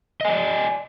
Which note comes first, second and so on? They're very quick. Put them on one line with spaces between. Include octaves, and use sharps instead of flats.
D#5 G#5 D5